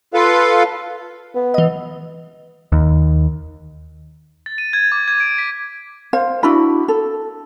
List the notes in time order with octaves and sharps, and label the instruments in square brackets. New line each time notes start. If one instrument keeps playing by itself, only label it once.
[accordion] F4 A4 B4 F5
[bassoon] B3
[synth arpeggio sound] E3 D#5
[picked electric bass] D#2
[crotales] A6
D#7
G#6
D6
G#6
D7
B6
[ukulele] C5 F5
D4 E4 F#4 B5
A4